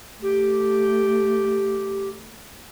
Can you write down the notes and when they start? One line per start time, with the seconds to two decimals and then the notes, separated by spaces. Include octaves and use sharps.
0.22 A3 G4